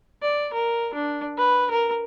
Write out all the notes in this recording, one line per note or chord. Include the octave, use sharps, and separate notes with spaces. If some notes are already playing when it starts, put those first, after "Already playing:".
D5
A#4
D4
B4
A#4